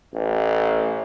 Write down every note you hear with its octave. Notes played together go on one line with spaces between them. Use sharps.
A1